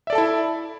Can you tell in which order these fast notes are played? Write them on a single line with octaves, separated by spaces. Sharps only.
E5 D5 A4 A5 E4